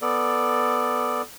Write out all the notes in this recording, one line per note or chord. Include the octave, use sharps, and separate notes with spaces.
B3 A4 D5